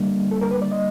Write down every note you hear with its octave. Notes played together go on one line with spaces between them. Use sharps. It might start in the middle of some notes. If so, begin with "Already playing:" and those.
Already playing: D3 G3 A#3 D4
A4
A#4
B4
D5
D#5